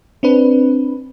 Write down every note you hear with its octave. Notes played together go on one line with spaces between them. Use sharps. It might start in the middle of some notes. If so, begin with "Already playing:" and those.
C4 D4 B4